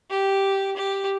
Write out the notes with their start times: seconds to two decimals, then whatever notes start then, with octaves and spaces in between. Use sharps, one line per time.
0.10 G4
0.77 G4